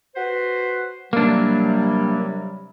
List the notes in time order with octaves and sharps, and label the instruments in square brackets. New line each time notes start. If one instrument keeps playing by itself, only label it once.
[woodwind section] F#4 B4 C5
[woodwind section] C3 F#3 G3 [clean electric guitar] A#3 D4